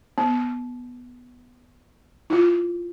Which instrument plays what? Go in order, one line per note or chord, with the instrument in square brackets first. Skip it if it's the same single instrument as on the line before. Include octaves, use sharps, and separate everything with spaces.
[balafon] B3
E4 F4